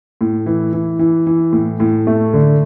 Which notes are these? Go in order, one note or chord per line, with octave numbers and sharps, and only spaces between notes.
A2
E3
E3
E3
E3
A2
A2
A3
D3